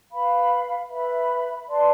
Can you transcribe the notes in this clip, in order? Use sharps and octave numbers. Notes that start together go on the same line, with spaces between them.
B4 F5 B5
B4 E5 B5
B4 D5 A5 C6